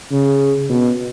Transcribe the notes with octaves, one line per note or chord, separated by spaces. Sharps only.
C#3
B2